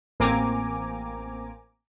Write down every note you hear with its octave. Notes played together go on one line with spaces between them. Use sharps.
A1 A#3 C4 G#5 A#5 D6